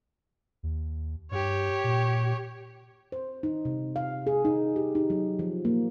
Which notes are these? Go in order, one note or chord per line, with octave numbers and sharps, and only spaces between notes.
D#2
G2 G4 C#5
A#2
C5
D#4
C3
F5
G#4
D#4
G4
D#4
F#3
F3
A#3